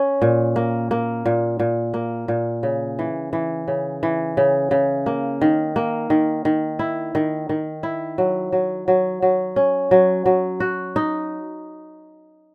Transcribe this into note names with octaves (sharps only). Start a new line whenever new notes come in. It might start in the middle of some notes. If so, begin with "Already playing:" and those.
Already playing: C#4
A#2
A#3
A#3
A#2
A#2
A#3
A#2
C#3
E3
E3
C#3
E3
C#3
C#3
A#3
D#3
A#3
D#3
D#3
E4
D#3
D#3
E4
F#3
F#3
F#3
F#3
C#4
F#3
F#3
F#4
D#4